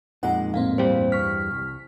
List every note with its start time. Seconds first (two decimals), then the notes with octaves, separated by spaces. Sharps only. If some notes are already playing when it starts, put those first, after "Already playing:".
0.23 F2 A#2 G#3 D#4 A#4 F#5
0.54 A2 A#3 C4 F5
0.78 E2 G2 G3 C5
1.12 C#6 F6 B6
1.51 C2